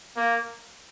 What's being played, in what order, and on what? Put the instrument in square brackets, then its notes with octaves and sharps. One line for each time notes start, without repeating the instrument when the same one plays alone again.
[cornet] A#3